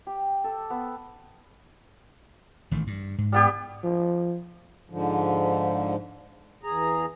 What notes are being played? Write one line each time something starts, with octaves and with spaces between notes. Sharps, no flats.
G4
A4
B3
A1 D#3 A3
G2
G#2
G3 B3 G4
F3
G#2 D3 F3
E2 G#4 A#5